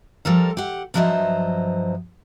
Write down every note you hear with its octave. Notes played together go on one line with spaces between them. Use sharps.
F3 G3 A4 A#4
G4 F#5
G2 F3 F#3 C5 D#5 E5